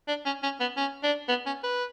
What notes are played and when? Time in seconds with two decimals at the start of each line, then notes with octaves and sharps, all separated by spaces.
0.08 D4
0.26 C#4
0.43 C#4
0.60 B3
0.77 C#4
1.04 D4
1.29 B3
1.46 C#4
1.63 B4